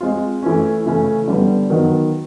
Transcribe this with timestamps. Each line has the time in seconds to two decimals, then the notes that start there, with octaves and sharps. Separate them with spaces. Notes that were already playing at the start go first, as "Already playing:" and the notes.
0.01 G#3 C4 F4
0.43 E3 A3 C#4
0.85 C#3 E3 A3 C#4
1.28 D3 G3 B3
1.70 D#3 F#3 B3